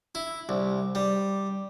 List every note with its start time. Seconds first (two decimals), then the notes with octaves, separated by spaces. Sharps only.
0.15 E4
0.49 C2
0.95 G3